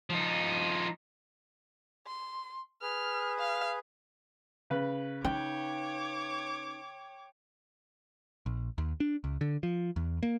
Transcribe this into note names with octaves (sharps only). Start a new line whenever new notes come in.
F3 D#4
C6
G#4 B4 F6
F5
C#3 B4
D#4 C#5 G5 D6
A#1
D#2
D4
C#2
D3
F3
E2
A#3